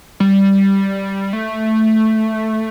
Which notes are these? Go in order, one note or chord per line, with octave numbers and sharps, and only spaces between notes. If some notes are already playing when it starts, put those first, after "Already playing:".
G3
A3